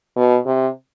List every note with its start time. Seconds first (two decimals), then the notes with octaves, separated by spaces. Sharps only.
0.16 B2
0.46 C3